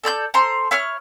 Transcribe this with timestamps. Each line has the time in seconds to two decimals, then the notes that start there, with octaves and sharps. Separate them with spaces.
0.04 A4 D5 E6 G6
0.34 A4 C5 A#5 C6
0.71 E4 C#5 F6